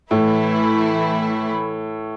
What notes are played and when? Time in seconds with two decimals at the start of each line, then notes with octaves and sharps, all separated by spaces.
0.11 A2 E3 A3 E4